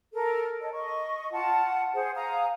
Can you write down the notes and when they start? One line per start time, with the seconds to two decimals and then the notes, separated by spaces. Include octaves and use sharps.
0.13 A4 A#4
0.61 A4 C#5 D#5
0.73 D#5 C#6
1.32 F4 F#5 A5
1.94 G#4 C5 F#5
2.16 F5 G#5 A#5 D#6